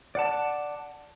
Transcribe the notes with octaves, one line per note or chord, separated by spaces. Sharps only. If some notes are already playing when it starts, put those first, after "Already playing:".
D5 F#5 A5